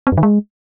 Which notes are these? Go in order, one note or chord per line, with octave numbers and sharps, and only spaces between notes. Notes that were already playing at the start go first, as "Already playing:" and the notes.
C4
F#2
D#3
G#3